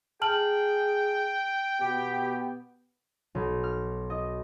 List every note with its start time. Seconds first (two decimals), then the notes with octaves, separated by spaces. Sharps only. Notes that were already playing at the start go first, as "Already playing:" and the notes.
0.22 G#4 G5 A5 F6 F#7
1.81 B2 B3 G4
3.35 B1
3.63 F6
4.10 D#5